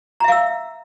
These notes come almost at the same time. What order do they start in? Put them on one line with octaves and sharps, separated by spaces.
A#5 E5 F5 E6